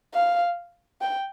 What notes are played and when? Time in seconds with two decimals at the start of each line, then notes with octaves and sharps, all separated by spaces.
0.14 F5
1.01 G5